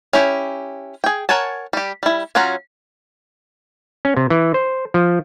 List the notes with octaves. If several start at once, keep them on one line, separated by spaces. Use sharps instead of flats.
C#4 E4 G4
G#4 G5
A#4 C#5 F#5 G#5 A5
G3 G4
G3 E4
F#3 C#4 F4 F#5 A#5
C#4
C3
E3
C5
F3